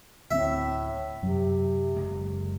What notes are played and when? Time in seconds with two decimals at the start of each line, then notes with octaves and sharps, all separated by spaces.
0.31 D2 A2 G3 C4 E5
1.22 F#2 C3 F#3
1.95 F#1 G#3 A#3